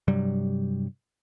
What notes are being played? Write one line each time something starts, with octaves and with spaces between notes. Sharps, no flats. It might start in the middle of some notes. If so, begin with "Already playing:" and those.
G2 C3 F#3 G3